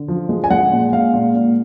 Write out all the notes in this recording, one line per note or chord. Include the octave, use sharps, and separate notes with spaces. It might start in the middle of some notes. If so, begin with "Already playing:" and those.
Already playing: D3
F3
G#3
G#5
G#3 F#5
A#2
G#3 F5
A#2
A#2